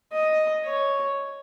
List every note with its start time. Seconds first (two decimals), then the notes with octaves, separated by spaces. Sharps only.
0.13 D#5
0.65 C#5